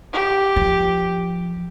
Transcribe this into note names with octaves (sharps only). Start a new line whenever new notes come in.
G4
F3